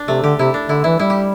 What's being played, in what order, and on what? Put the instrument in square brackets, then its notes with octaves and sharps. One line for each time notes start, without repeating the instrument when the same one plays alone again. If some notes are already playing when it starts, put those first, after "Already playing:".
Already playing: [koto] D4
[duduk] C3 [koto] A3
[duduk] D3 [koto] G4
[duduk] C3 [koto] E4
[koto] D4
[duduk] D3 [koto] E4
[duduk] E3 [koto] E4
[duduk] G3 [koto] E4
[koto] G4